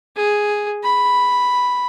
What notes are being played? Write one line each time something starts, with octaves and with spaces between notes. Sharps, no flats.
G#4
B5